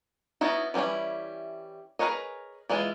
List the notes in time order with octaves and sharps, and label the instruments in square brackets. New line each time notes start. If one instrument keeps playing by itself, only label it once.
[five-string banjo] B3 C#4 D#4 E4 F#4
E3 G3 C4 C#4 E4
G#4 A#4 B4 C#5 D#5
E3 G#3 E4 F4